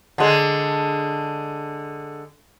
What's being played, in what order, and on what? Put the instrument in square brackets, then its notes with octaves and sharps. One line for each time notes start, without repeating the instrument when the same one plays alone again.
[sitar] D3 G#3